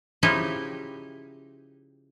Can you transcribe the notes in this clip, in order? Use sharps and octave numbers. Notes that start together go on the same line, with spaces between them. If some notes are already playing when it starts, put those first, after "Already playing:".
C#3 F3 D#4 E4 G4